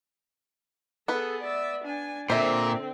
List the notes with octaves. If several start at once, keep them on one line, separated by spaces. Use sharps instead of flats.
B3 G#4 A4 B4
D5 E5
D4 G#5
A#2 D3 C4 C5 E5